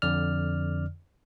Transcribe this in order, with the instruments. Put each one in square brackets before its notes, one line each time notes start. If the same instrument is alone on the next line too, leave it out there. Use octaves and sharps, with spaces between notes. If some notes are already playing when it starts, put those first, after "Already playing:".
[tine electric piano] F2 D3 D5 F6